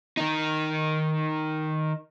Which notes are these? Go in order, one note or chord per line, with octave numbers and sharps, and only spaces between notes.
D#3 D#4